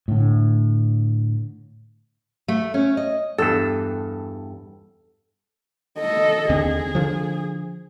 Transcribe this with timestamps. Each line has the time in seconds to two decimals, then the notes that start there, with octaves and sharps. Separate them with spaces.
0.08 A2 D3
2.48 A3
2.74 C#4
2.97 D#5
3.38 E2 G2 A4
5.99 A4 D#5
6.49 D#2 D3 C4 G#4
6.95 D3 F3